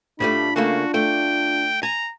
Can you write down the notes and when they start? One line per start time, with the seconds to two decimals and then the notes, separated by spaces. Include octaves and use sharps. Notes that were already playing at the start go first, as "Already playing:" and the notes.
0.20 A2 G3 A3 D4 F4 B5
0.56 C#3 A3 A#3 F#4
0.94 A3 G5
1.83 G#5 A#5